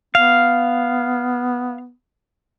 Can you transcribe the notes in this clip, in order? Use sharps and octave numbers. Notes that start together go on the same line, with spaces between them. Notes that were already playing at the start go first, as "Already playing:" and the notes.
B3 F5